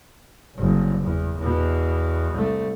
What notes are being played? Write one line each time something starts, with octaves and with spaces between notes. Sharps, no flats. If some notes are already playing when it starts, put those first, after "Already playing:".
F#1 C2
E2
E2 B2
C2 A3